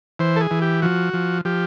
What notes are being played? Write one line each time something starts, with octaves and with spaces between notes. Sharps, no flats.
E3 C5
A4
G#4
E3
G4
F3 F#4
F3
F3 G4